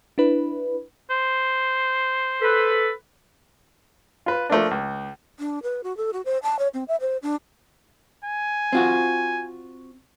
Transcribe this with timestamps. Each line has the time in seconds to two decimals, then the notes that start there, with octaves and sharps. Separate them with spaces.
0.18 D4 E4 B4
1.10 C5
2.41 A4 B4
4.26 F4 B4
4.50 F3 A3 A#3 D4
4.71 C#2
5.39 D4
5.63 B4
5.84 F#4
5.97 A4
6.13 F#4
6.25 C5
6.43 A5
6.59 C#5
6.74 C4
6.88 E5
7.01 C5
7.23 D4
8.25 G#5
8.73 C4 F4 F#4